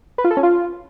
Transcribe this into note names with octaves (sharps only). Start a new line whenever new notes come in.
B4
F4
A4
C#4
F4